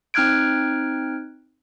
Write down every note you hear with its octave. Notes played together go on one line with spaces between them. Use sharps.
C4 D#4 F6 F#6 G#6 D7